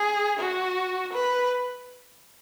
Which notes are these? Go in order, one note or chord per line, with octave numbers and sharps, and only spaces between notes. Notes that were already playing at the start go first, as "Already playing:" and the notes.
Already playing: G#4
F#4
B4